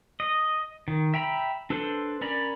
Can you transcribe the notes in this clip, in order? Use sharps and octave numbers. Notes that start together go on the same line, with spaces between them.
D#5
D#3
E5 G5 A#5 B5
D4 A4 B4 C5
C#4 A#4 D5 A#5 B5